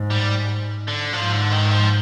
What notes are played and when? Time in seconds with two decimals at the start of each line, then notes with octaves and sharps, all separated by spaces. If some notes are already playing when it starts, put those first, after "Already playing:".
Already playing: G#2
0.10 G3
0.88 D3
1.13 G#2 F3
1.32 D3
1.51 D#3
1.71 F3